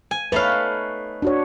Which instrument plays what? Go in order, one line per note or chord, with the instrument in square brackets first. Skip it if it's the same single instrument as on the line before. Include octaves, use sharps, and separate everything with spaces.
[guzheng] G#5
[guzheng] A3 D#4 F5 [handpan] B4 C#5
[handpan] D4 F#4 C#5